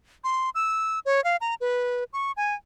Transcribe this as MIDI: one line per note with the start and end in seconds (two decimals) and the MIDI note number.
0.24 0.50 84
0.55 0.99 88
1.05 1.23 73
1.24 1.36 77
1.41 1.55 82
1.61 2.04 71
2.13 2.32 85
2.37 2.55 80